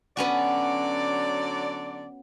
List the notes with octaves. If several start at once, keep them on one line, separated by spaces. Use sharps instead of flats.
D3 F#3 B3 C#4 F#4 D5